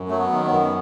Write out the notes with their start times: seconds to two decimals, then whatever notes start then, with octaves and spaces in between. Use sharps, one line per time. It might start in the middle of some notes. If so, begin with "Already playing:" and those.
Already playing: F#2
0.08 F#3 A3
0.19 B3
0.32 D#3
0.45 B3
0.51 F#2